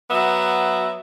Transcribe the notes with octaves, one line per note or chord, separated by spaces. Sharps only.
F#3 B3 E5